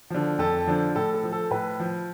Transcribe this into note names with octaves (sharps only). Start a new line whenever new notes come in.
D3 F3
F2 A4
D3 F3
A2 A4
A4
F3
A4
A2 B4
F3